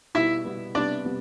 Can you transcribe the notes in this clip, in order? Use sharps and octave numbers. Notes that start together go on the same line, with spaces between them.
B2 G3 B3 E4 E5
B2 G3 B3
C3 G3 B3 D4 D5
C3 G3 B3